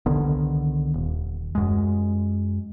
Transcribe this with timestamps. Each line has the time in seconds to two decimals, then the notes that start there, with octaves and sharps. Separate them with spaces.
0.06 C2 D3 D#3 B3
0.94 D#1
1.55 F#2 G#3